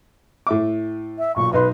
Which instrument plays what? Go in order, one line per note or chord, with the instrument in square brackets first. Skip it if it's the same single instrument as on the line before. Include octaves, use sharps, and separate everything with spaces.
[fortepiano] A2 E5 D6
[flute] E5
[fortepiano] B1 A#2 [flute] C#6
[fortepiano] B1 D#4 C6 [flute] B4